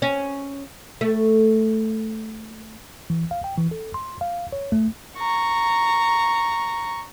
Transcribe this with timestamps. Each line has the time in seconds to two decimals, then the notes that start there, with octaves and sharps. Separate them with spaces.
0.02 C#4
1.01 A3
3.10 E3
3.31 F5
3.44 G5
3.57 E3
3.71 A4
3.94 C6
4.21 F5
4.52 C#5
4.72 A3
5.18 A#5 C#6